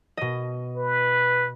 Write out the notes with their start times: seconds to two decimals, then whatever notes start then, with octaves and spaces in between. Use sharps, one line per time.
0.17 B2 D#5
0.77 B4